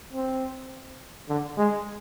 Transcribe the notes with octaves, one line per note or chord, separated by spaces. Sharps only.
C4
D3
G#3